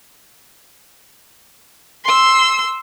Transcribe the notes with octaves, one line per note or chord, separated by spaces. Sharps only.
C6 E6